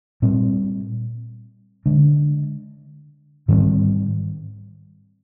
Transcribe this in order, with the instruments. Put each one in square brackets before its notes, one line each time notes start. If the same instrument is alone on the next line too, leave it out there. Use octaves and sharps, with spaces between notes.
[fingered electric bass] A#2 G3 C4
D3 G#3 D4
G#2 D#3 G3 C4